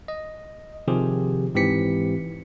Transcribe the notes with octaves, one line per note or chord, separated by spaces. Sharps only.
D#5
C3 D#3 F3 G4 G#4
G#2 E3 C4 G4 B6 C#7